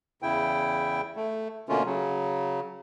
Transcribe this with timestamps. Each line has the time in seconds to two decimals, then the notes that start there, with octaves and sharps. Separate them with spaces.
0.22 E2 C#3 E4 G5
1.16 A3
1.69 B2 D3 A3 A#3 C#4 F4
1.86 C#3 F#3